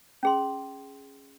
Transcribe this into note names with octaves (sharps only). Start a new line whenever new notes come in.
C#4 G#4 C6